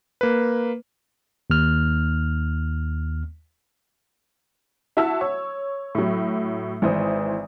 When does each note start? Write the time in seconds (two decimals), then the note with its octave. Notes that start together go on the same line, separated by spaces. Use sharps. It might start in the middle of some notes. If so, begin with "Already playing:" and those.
0.21 A#3 B4
1.50 D#2 F6
4.97 E4 F#4 E5 A5 E6
5.21 C#5
5.95 A2 F#3
6.82 G#1 E3 C5 D#6